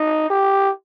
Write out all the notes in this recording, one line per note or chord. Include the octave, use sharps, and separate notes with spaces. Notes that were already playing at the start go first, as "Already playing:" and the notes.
Already playing: D#4
G4